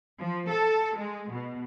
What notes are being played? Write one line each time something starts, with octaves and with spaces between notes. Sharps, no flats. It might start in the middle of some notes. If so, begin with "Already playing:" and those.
F3
A4
G#3
B2